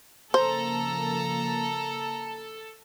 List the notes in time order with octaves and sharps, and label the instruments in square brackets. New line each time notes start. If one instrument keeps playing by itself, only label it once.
[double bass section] C#3 F3 A#3 [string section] A4 [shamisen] C5 [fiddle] A#5